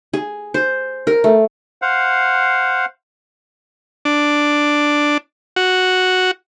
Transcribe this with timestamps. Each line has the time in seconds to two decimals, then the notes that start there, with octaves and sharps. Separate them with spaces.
0.13 G#4
0.54 C5
1.07 A#4
1.24 A3
1.82 C5 F5 F#5
4.05 D4
5.56 F#4